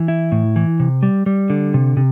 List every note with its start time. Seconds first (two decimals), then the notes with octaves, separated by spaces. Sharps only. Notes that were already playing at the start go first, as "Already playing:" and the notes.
Already playing: E3
0.08 E4
0.32 A2
0.56 E3
0.80 C3
1.03 G3
1.26 G3
1.50 D3
1.74 C3
1.97 C3